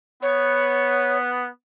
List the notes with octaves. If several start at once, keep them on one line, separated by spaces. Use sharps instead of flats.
B3 C#5